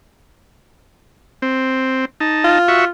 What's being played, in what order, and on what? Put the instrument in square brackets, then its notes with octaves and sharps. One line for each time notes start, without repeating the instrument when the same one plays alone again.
[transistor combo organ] C4
D#4 A5
[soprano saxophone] F4
[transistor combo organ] F#4 E5 C#6